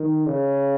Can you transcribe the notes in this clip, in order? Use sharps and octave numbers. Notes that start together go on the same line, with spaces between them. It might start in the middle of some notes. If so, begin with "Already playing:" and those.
Already playing: D#3
C#3